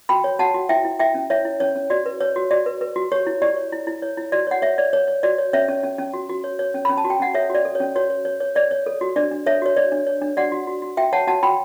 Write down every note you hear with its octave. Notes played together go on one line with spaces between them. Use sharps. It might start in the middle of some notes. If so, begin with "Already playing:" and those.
F#4 G5 B5
C#5
F#4 F#5 A5
F#4
E4 E5 G5
E4
E4 E5 G5
C#4
E4 C#5 E5
E4
C#4 C#5
C#4
F#4 D5
B4
B4 C#5
F#4
F#4 D5
B4
B4
F#4
G4 C#5
E4
G4 D5
C#5
E4
E4
C#5
E4
F#4 D5
C#5 F#5
C#5 E5
C#5 D5
C#5
C#5
F#4 D5
C#5
C#4 C#5 E5
C#4
C#4
C#4
F#4
F#4
C#5
C#5
C#4
C#4 B5
A5
F#4
G5
C#4 F#5
A4 C#5 E5
F#4 D5
A4
C#5
C#4
F#4 C#5
C#5
C#5
C#5
C#5 D5
C#5
A4
F#4
D4 D5
D4
A4 C#5 E5
F#4 C#5
C#5 D5
D4
C#5
D4
F#4 D5 F#5
F#4
F#4
F#4
F#4 E5 G5
C#5 F#5 A5
F#4 F#5 A5
F#4 G5 B5